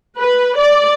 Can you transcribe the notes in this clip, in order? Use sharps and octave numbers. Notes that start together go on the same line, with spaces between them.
B4
D5